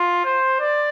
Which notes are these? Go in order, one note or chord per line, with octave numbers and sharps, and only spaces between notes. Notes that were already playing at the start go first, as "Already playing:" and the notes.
Already playing: F4
C5
D5